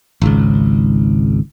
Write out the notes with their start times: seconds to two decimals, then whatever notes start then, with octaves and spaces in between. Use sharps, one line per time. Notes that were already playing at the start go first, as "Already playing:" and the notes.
0.22 G#1 C#2